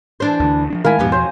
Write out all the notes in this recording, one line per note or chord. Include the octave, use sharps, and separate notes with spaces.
E3 D4 C5
D2 D3
F3 G#3 D4
D#3 G#3 A3 E4 A#4 F5 G#5
E2 G#2 B2 F3 B3 G4
F#3 C5